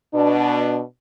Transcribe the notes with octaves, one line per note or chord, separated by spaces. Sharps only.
B2 D4